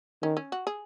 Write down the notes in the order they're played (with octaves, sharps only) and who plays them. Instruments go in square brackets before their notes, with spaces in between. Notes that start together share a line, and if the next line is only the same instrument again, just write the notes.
[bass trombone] D#3 [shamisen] C#4
[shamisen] C#4
F#4
G#4